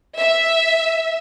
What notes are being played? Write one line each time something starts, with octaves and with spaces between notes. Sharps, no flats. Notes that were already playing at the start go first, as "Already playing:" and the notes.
E5